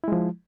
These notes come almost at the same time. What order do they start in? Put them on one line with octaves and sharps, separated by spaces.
E4 G#3 F3